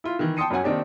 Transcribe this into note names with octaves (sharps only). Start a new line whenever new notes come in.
E4 F4
D#3 E3
G5 A5 C6 D#6 C#7 D#7
F#2 F#3 C#4 F#5 G#5
D#3 A#3 C4 D4 D#4 G4